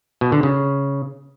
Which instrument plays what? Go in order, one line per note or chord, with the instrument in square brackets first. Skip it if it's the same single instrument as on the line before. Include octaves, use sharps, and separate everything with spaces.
[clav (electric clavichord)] B2
D3
C#3